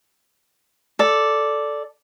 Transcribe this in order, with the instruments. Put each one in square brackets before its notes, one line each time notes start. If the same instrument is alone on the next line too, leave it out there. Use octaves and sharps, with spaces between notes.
[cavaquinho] A4 D5